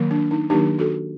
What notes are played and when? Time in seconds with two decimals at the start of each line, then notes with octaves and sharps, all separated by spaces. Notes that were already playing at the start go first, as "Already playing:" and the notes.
Already playing: D#3 F#3 A#3
0.11 D4
0.31 D#4
0.50 D#3 F#3 A#3 D4 D#4 G4
0.79 F#4 A4